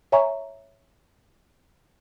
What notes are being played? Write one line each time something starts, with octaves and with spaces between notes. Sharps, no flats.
C#5 E5 G#5 A#5 C#6